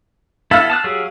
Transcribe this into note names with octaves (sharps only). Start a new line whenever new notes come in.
B3 E4 A4 F5 E6 F6
A5 D#6 F#6
F#3 G4 G#4